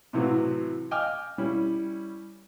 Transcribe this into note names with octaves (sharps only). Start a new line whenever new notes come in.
A2 C3 E3 F#3
D#5 G5 G#5 D6 F6
G3 C#4 E4